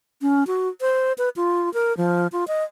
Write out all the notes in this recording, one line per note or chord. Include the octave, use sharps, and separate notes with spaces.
C#4
F#4
C5
B4
F4
A#4
F3
F4
D#5